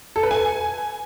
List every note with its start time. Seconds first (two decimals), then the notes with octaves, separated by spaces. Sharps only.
0.16 A4
0.23 B4
0.31 G#5